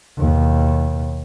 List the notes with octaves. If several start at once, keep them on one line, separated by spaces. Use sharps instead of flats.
D#2 B2